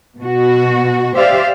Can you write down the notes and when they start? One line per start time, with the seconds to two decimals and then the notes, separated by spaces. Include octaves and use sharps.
0.19 B2 F#4
1.16 G4 C5 D5 E5 F5